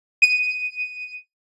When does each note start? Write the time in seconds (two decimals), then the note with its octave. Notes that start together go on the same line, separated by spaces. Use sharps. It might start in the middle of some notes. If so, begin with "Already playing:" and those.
0.22 D#7